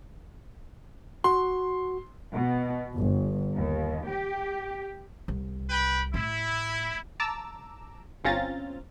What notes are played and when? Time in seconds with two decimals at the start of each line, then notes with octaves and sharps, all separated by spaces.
1.24 F#4 C6
2.33 B2
2.97 G1
3.56 D#2
4.09 G4
5.28 C2
5.70 B4 G5 B5
6.14 A2 E4
7.20 A5 A#5 D6 E6
8.24 G1 C4 C#4 F4 A#5 A6